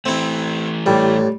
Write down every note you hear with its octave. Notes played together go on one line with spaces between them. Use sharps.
E3 A3 C4 E4
A1 A2 G3